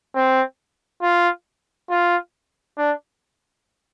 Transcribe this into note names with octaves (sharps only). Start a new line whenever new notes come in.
C4
F4
F4
D4